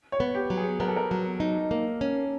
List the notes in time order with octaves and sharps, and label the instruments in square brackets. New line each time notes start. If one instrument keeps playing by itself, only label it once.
[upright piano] C#5
[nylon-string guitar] B3
[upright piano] G4
[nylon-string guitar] F#3
[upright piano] G#4
[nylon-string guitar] B3 [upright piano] A#4
[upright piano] A4
A#4
[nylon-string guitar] F#3
D#4
A#3
C#4